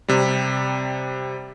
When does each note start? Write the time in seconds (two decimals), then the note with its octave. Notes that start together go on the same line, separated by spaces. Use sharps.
0.08 C3 G3